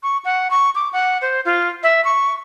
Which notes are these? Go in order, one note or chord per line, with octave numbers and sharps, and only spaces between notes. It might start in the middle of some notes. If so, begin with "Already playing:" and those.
C#6
F#5
C#6
D6
F#5
C5
F4
E5
C#6